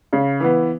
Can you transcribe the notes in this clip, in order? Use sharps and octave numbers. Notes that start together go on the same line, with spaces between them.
C#3
E3 B3